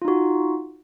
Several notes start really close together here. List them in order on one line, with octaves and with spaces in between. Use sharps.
F4 D#4 F#4